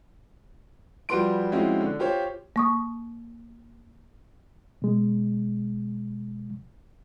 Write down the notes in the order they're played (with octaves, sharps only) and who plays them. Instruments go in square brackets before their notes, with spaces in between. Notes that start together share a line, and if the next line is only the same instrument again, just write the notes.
[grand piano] F3 G3 F#4 B4 C6 D7
F3 G#3 C4 C#4 E4 F#4
D3
F4 G4 C5 C#5
[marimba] A#3 C#6 D#6
[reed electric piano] B2 G#3